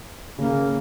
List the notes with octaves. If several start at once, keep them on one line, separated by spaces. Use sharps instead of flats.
C#3 A#3